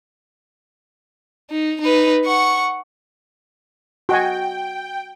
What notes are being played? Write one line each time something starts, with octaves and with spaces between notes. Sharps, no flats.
D#4
D#4 B4
F#5 C#6
F#4 D#5 G5 G#5